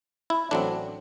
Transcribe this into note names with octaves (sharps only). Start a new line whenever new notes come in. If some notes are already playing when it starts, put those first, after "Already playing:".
E4
A1 A2 F#3 C4 D4